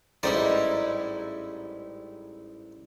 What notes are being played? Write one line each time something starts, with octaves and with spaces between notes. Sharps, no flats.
A1 G#2 G3 D#4 E4 D5